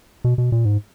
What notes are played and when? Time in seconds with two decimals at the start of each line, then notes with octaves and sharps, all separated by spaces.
0.24 B2
0.38 B2
0.52 A#2
0.65 G#2